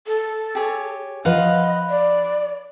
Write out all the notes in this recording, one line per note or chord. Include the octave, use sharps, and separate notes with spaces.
A4
G4 G#4 C#5
F3 B4 D#5 F5 F#5
D5